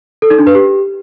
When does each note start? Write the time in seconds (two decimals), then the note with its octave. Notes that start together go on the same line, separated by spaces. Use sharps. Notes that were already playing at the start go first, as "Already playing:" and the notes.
0.22 A4
0.30 D#4
0.39 D4
0.47 B4
0.55 G4